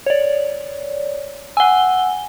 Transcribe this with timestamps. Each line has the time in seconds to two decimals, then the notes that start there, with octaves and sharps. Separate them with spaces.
0.06 C#5 D5
1.57 F#5 G#5 E6 G7